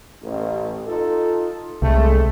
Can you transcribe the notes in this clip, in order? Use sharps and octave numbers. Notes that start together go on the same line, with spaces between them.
A1
D#4 F4 A4
C2 G#3 A3